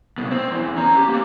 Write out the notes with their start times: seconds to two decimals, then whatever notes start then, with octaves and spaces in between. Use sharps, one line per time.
0.18 C2 B2
0.31 C4
0.51 E2
0.76 C#4 A#5
0.96 G4
1.08 A#3 G4